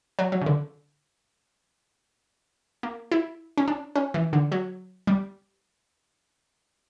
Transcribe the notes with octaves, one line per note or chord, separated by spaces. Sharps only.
F#3
F#3
C#3
D3
A#3
E4
C#4
D4
C#4
E3
D3
F#3
G3